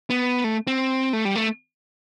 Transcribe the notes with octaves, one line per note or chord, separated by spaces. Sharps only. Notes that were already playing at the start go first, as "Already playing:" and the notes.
B3
A3
C4
A3
G3
A3